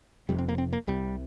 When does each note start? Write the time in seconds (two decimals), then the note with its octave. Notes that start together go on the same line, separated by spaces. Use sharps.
0.29 F1 F2 C3 G3
0.38 C4
0.48 A#3
0.58 C4
0.73 A#3
0.87 C2 C3 G3